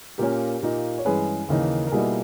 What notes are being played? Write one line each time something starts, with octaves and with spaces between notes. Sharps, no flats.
A#2 A#3 C#4 G4 A#4
A#2 A#3 D#4
C#5
G2 E3 G#3 C#4 G#4 B4
D#2 C#3 E3 A#3 D#4
A#4
B2 G3 A#3 D#4 E4 G#4